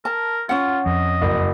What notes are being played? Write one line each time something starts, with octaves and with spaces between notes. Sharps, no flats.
A#4 A5
C#4 F4 F#5
F2 D#5
F#1